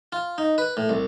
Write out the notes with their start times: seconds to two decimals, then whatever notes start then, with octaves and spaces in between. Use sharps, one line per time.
0.12 F4
0.38 D#4
0.58 B4
0.77 A2
0.89 C2